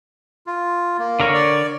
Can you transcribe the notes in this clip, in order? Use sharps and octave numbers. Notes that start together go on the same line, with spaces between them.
F4
A#3
D3 A#4 C#5
D5